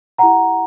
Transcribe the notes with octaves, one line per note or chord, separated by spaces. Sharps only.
E4 G4 C#5 F#5 A#5